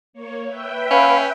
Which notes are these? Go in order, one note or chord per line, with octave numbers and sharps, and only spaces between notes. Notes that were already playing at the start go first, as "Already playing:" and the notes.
A#3 C#5
B4 E5 G5
C#4 F5 F#5 B5